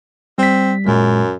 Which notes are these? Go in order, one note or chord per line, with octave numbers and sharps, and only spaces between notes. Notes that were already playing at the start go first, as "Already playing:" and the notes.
G3 C4 B6
F#2 A#2 G#3